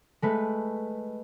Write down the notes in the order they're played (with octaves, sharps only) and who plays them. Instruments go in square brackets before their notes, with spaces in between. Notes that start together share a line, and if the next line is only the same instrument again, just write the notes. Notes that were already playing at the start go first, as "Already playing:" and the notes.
[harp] G#3 A3 B4